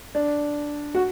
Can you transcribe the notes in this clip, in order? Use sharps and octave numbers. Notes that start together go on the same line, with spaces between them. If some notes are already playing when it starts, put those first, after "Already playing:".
D4
F#4